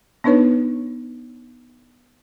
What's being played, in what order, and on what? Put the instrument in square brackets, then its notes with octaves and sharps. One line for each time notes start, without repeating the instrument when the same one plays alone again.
[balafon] B3 D4 D#4 B4 C#5